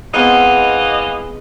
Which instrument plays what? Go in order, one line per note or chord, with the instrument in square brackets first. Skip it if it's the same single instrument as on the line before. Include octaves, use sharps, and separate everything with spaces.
[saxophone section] E3 D#5 F5 [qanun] G#3 B3 C4